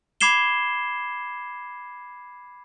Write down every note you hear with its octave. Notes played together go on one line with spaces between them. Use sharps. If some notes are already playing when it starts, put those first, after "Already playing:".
B5 D6 G#6 C7 E7 G7